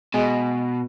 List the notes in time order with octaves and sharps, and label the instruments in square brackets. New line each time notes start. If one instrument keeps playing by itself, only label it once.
[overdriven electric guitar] B2 [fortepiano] G#3